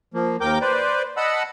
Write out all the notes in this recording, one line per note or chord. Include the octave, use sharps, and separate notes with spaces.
F3 A#3
D#2 A#4 G5 D6 G6
B4 C5 D5
D#5 F#5 A5 B5 E6